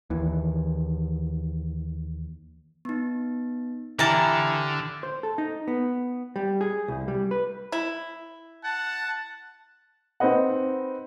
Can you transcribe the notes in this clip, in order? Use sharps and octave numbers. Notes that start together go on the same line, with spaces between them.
D#2 E3
B3 D#4
D3 E3 E4 G4 G5 A5 A#5 F6
C5
A4
D#4
B3
G3
G#4
C2
G3
B4
E4
F#5 A5
C4 D#4 B4 D#5 F#5